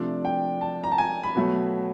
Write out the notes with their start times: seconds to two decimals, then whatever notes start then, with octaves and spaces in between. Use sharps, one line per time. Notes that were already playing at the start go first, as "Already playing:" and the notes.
Already playing: C3 F3 A3 D4 D5
0.25 G5
0.61 A5
0.84 A#5
0.91 A5
0.98 G#5
1.23 B5
1.36 B2 F#3 A3